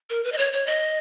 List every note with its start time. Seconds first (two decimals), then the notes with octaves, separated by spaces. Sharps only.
0.10 A#4
0.24 B4
0.32 D#5
0.38 C#5
0.53 C#5
0.67 D#5